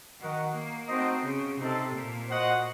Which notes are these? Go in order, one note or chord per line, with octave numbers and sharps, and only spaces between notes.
D#3 F#4 A#4 D#5 F#5
A#3
A3 C4 D#4 F#4 C5 D#5
C#3
C3 C4 D#4 A4
A#2
F#4 C5 D#5 F#5